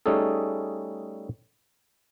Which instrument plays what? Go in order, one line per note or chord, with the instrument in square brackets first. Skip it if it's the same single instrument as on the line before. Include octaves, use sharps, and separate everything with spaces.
[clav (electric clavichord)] G3 A3 C#4 D#4 G#4 A4